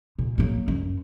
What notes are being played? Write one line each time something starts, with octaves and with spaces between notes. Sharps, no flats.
A#2
F#3 A#3
F#2